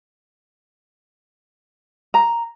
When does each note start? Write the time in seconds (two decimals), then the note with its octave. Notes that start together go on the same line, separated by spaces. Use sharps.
2.14 A#5